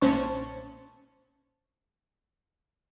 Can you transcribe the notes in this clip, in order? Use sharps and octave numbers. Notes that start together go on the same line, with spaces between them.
B1 A#2 C#4 C5 A5 C#6